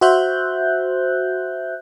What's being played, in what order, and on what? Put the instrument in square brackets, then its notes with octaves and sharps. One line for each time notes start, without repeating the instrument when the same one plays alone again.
[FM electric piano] F#4 C5 E5 F#6 G6